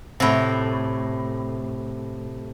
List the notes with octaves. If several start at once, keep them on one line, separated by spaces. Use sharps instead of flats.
A2 C3